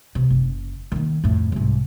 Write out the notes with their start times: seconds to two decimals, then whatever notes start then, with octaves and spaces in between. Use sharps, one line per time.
0.15 C3
0.30 F#1
0.92 D#3 A#3
1.24 F2 A2
1.52 C2 G#2